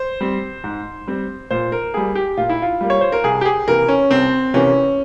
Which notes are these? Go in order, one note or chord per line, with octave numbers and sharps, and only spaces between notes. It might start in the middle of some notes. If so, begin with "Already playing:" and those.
Already playing: C5
G3 C4
G#2
G3 C4
A#2 C5
A#4
G3 A#3 G#4
G4
A#2 F4
E4
F4
G3 A#3
C#5
C5
A#4
C2 G#4
G4
G#4
C3 E3 A#3 A#4
C#4
C2 C4
C3 E3 A#3 C#4